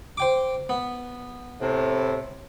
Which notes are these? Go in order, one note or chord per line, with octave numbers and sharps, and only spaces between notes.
C5 G5 D6
B3
A2 C3